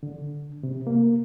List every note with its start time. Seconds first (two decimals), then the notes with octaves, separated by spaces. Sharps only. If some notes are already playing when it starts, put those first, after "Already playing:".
0.03 D3
0.63 C3
0.87 A#3